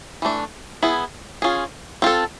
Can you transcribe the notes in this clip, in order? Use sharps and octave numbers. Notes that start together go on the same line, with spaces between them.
E3 A3 D4
B3 E4 G#4
C#4 F4 G#4
C4 F4 A4